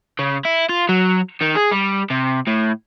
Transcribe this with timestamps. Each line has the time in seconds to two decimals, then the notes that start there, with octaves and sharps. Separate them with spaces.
0.19 C#3
0.45 E4
0.69 F4
0.89 F#3
1.41 D#3
1.55 G#4
1.71 G3
2.10 C3
2.47 A2